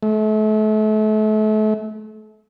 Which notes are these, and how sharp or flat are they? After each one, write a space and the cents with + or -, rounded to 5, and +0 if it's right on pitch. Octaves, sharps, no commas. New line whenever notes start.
A3 -35